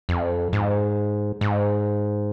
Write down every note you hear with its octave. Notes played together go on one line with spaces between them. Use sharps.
F2
G#2
G#2